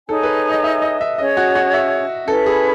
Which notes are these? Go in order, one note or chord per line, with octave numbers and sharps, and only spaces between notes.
D#4 G#4 A4 C#5 G#5
B4
D#5
E5
D#5
E5
C#4 G#4 C#5 D#5
F#4
F#4
E5
C#4 E4 A4 B4
G#4